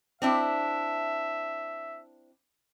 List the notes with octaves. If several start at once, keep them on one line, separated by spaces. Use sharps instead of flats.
C4 D4 E4 E5